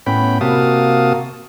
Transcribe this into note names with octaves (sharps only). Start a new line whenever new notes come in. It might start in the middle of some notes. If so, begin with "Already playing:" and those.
A2 B3 C#4 G5 B5
C3 A#3 F#4 F5 A5 D#6